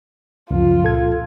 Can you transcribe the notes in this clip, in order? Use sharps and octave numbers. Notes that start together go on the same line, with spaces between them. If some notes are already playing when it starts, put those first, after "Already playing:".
C#2 F#2 F3 F4
A#2 A4 G#6